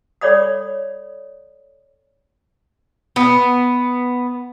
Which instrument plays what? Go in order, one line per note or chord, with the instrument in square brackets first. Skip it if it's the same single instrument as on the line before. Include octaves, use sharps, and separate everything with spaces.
[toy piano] A4 C#5 D5 B5 D#6
[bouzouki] B3